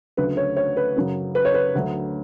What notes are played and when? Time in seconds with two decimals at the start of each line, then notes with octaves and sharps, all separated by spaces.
0.17 D2 C#3 F#3 B4
0.37 C#5
0.57 C#5
0.77 B4
0.96 F#2 C#3 F#3
1.35 B4
1.45 C#5
1.54 B4
1.75 D2 D3 F#3